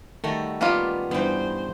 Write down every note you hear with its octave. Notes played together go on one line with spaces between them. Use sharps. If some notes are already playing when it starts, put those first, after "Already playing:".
D#3 G3 A3 F#4 A4
G3 A#3 B3 C#4 F4 D5
G2 E3 G3 B3 C5 G5